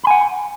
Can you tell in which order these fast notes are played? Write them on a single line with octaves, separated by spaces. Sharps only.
B5 G#5 F#5